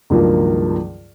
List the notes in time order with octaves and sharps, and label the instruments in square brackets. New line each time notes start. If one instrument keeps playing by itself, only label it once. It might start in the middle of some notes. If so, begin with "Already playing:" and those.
[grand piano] C#2 G2 D#3 F3 F#3 A#3